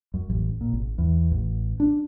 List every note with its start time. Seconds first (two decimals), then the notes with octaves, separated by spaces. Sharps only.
0.14 F#2
0.30 A1
0.61 A#2
0.73 G#1
0.98 E2
1.31 A1
1.80 D4